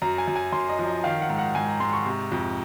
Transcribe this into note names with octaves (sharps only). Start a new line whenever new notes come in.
F#2 A#5
G#5
F#2
G#5
F#2 C6
D#5
F3
D#5
D#3 F5
F#5
G#2
F#5
G#2 G#5
A#5
G#2 C6
C#6
C3
F2